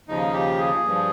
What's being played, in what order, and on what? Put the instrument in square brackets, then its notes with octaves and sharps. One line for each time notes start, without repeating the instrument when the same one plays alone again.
[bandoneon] D#2 C#3 F3 D#4
G4
G#4
G2 F3